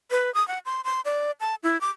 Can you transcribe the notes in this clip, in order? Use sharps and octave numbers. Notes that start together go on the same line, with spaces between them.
B4
D#6
F#5
C6
C6
D5
A5
E4
D6